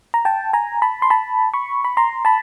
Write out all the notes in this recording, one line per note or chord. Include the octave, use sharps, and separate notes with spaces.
A#5
G5 A5
G#5 A#5
A5 B5
C6
A5 B5
B5 C#6
B5
A#5 C6
A5 B5